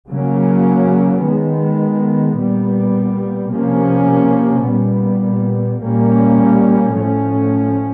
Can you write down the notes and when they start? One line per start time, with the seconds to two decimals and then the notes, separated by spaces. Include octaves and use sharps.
0.10 C#3 F#3 A#3 C#4
1.25 D#3 G#3 B3
2.39 A#2 G3 B3
3.53 C3 F3 A#3 C#4
4.68 A#2 G3 B3
5.82 A#2 G3 A#3 C#4
6.96 A2 F3 A3 C#4